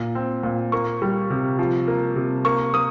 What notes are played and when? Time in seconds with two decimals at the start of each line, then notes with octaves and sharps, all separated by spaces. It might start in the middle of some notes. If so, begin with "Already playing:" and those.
Already playing: A#2
0.15 C4
0.43 A#2
0.72 A#3 C#6
1.02 G3
1.30 C3
1.59 F3
1.88 A#3
2.16 C3
2.45 A#3 C#6
2.74 A#3 D#6